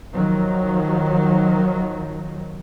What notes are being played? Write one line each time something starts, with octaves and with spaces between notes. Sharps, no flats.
D#3 F3 F#3